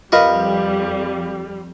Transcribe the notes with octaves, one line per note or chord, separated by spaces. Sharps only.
F2 G3 F4 A#4 B4 D#5 C#6